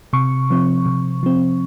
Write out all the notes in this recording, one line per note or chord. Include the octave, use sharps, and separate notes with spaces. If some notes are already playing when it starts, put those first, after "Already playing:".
C3 C#6
F3 C4
C3
F3 C4